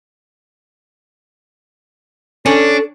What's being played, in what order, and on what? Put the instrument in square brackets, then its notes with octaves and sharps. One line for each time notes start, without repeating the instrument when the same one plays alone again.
[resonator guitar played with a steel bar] C#4 [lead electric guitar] D4 [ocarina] A4